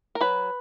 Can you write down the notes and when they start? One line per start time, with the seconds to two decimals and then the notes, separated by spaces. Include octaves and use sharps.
0.15 A#4
0.21 F#3 B4